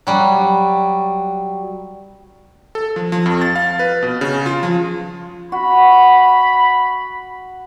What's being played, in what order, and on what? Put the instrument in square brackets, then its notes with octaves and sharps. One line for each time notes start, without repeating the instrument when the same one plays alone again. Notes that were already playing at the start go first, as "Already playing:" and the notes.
[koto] F#3 G3
[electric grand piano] A4
F3
F3
F2
A6
F5
B4
B2
C#3
F4
F3
[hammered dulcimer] F#4 [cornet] B5